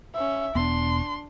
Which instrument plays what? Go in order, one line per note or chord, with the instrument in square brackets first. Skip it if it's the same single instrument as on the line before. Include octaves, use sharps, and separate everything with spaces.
[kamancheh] C#4 E5
[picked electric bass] E1 B3 [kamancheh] D4 [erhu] C6